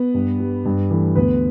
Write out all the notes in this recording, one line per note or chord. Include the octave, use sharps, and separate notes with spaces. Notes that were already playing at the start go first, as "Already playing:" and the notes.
Already playing: B3 B4
G2
G3
G2
E3 A3
D2 B3 B4